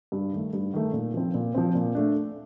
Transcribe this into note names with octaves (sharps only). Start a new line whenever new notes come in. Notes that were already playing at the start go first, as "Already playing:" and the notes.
G2
D#3 A3
G2
D#3 A3
A#2
F3 C4
A#2
F3 C4
A#2
A3 D4